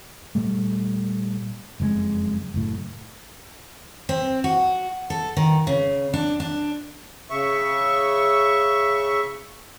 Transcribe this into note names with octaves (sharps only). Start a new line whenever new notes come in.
A#2 G3 A3
F#1 F2 C#3 G#3
F#1 A2
C4
F#4
A4
D#3
C#3
D4
D4
C#3 E5 C#6